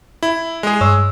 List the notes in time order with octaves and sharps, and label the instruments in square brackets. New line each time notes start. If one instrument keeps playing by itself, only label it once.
[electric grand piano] E4
G#3 G#4
[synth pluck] G2 C#5 E6